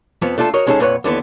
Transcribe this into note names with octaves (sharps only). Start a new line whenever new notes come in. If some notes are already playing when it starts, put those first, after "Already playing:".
F2 F3 B3
A3 D4 F4 A4
F#4 A#4 C#5 D#5
G#3 C#4 D#4 G#4 A4
F2 A#2 B4 C#5 F#5
D#2 D3 E3 B3